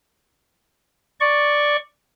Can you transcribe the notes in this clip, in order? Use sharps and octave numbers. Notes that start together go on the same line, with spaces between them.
D5 C#6